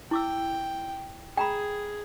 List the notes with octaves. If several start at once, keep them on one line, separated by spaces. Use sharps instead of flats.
E4 G5 D6 E6
G#4 G5 A#5 B5